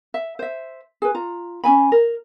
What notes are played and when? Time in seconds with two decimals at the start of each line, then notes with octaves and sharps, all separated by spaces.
0.14 E5
0.39 C5 E5
1.02 G#4 B4
1.14 F4 A#5
1.64 C#4 D4 G#5 B5
1.92 A#4